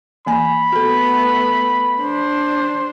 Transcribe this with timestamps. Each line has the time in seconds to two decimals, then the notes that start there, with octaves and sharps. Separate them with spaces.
0.26 E3 A#3 G#5 B5
0.73 A3 B3 F#4 A4
2.00 D4 C5